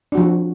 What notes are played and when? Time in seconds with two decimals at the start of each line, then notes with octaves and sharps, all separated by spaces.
0.12 D4
0.15 F#4
0.17 F3